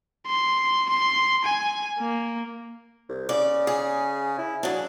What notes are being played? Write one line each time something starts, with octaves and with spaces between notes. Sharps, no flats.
C6
C6
G#5
A#3
C2
C#3 D5
G#4
E4
C#3 F#3 D4